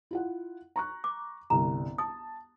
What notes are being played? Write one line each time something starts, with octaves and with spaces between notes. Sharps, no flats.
E4 F4 F#5
A#5 C#6 F#6
D6
G1 C2 A#5
A5 D#6